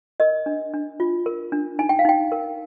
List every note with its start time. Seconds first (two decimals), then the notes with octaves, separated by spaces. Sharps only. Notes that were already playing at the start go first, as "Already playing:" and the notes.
0.20 A#4 D#5
0.46 D4
0.74 D4
1.00 F4
1.26 A#4
1.52 D4
1.79 D#4 G#5
1.89 G5
1.99 F5
2.05 D#4 G5
2.32 A#4